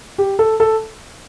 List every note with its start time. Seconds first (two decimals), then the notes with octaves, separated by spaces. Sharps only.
0.18 G4
0.39 A4
0.60 A4